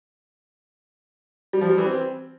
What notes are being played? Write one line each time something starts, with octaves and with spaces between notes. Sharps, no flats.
G3
F3
G3
E3
C4